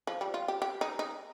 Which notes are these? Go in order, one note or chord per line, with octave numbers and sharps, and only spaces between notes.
F3
G3
F4
G4
G4
D#4
D#4